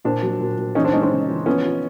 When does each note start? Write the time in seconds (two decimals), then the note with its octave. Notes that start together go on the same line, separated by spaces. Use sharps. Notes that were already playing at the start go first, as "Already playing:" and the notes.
0.05 A#2 C4 D4
0.22 F#3
0.40 A#2
0.58 A#2
0.75 E3 C#4 D#4
0.84 C4 D4
0.93 G#3 C#4 D#4
1.02 C4 D4
1.11 C#3
1.29 E3
1.46 F3 B3 C#4
1.65 F4